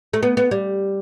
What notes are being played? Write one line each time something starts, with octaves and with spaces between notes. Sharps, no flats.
A3
B3
B3
G3